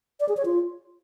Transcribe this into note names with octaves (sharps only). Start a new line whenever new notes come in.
D5
G#4
C#5
F4